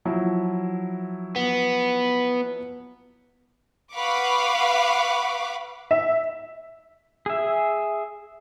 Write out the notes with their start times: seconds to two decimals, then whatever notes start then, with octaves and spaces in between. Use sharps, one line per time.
0.05 F3 F#3 E4
1.36 B3
3.93 B4 F5 F#5 B5 C#6 D6
5.91 E5
7.26 G#4 E5